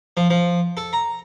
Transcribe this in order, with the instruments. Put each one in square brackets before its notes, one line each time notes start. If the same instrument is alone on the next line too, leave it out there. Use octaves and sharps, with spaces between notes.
[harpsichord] F3
F3
A4
A#5